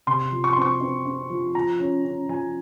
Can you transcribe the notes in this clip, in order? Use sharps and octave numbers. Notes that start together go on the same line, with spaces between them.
C3 C6
F3
C#6
C6
C4 C#6
C4
C4
F3
F3 A#5
C#4
C#4
F3 G#5